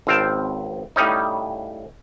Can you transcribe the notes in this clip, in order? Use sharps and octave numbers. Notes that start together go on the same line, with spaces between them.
G#1 C#2 C4 F5 G5 A5
A2 C#3 G3 C#4 D#4